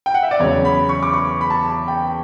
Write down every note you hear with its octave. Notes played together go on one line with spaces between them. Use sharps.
G5
F#5
E5
D5
E2 C#3 F#3 C#5
B5
C#6
D6
C#6
B5
A5
G5